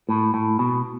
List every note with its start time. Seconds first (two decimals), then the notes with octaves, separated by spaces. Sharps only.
0.09 A2
0.34 A2
0.59 B2